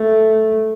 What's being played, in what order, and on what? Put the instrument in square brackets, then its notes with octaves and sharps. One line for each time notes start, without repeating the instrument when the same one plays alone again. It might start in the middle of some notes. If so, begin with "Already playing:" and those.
Already playing: [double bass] A3